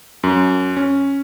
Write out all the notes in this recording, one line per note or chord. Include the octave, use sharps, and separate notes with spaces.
F#2
C#4